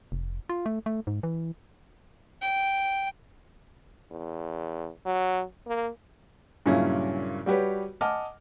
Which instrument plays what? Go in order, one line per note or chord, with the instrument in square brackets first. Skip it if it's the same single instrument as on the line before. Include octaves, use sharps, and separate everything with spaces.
[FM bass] F1
F4
A3
A3
G#2
E3
[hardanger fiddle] G5
[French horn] E2
F#3
A#3
[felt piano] G2 A#2 C#3 F#3 C#4 E4
G3 F#4 G4 B4 C#5
D#5 F#5 G#5 A5 D6 F6